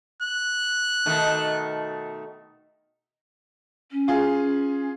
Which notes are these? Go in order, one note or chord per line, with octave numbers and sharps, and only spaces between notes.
F#6
B2 D#3 A3
C#4
F4 G#4